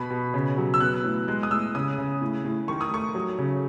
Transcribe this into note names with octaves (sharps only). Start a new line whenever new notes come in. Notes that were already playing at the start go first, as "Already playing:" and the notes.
Already playing: B2 B5
B2
C#3
F#3
E6
B3 F#6
A2
G#3 F#6
D#6
A2 E6
C#3 D#6
C#3
A2
A2
D#3 C#6
D#6
A3 C#6
F#3
C#3